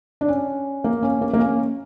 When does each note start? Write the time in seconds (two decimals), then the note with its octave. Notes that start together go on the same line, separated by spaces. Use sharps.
0.21 D4
0.28 C#4
0.84 A#3
1.03 C#4
1.21 A#3
1.34 A#3
1.39 C#4